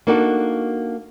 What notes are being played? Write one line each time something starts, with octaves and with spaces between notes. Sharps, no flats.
A#3 D4 D#4 F#4 A4